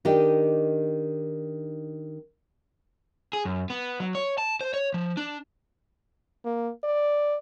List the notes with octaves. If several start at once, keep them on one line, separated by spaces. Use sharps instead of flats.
D#3 D4 D#4 G4
G#4
F#2
B3
F#3
C#5
A5
C5
C#5
F3
D4
A#3
D5